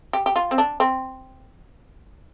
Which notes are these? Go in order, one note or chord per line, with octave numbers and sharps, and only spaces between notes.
G4
G4
F4
C4
D4
C4